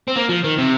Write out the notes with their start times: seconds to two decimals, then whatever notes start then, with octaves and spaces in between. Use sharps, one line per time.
0.08 C4
0.16 A#3
0.29 F3
0.44 D#3
0.58 C3